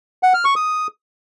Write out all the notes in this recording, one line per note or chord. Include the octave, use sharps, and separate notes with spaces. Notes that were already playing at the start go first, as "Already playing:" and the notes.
F#5
F6
C#6
D#6